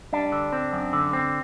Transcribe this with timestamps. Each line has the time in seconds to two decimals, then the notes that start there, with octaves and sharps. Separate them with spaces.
0.13 G3 D4
0.32 D3
0.53 C4
0.73 F#2
0.93 D3
1.13 C4